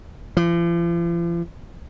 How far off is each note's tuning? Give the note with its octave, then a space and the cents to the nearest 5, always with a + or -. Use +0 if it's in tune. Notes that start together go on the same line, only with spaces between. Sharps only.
F3 -45